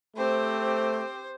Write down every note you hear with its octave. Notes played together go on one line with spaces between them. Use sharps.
A3 C4 G4 C5